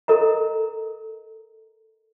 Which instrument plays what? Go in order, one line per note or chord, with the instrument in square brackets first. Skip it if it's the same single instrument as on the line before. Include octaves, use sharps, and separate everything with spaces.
[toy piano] A4 A#4 D#5 A#5